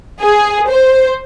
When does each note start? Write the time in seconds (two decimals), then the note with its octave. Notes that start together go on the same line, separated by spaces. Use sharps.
0.21 G#4
0.70 C5